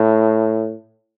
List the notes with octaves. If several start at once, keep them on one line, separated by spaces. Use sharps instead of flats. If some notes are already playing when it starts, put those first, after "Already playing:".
Already playing: A2